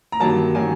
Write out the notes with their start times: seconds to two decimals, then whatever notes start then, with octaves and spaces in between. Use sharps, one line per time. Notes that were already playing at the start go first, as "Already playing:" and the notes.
0.12 A#5
0.20 G2 D#3 F#3 A#3 A5
0.55 D#3 F#3 A#3 G#5